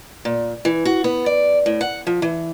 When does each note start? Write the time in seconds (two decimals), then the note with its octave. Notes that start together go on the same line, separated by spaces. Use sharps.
0.25 A#2
0.65 E3
0.85 F#4
1.04 B3
1.26 D5
1.66 A2
1.81 F#5
2.07 F3
2.22 E3